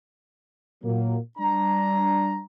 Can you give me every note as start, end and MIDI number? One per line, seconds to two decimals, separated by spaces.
0.83 1.16 46
0.83 1.16 54
0.83 1.16 58
1.38 2.40 55
1.38 2.40 62
1.38 2.40 82